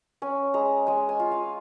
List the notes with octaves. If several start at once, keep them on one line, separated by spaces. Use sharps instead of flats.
C#4 G#5
G#3 A#5
G#3 G#5
G#5
F4
F5